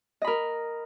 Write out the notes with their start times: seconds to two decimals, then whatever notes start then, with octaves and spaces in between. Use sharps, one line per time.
0.22 D#5
0.24 B5
0.27 A#4